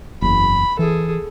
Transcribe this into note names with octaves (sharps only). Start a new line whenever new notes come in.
F#1 E2 B5
E3 G#4 A4